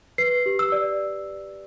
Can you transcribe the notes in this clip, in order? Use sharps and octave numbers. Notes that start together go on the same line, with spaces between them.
B4 C7
G4
E6
D5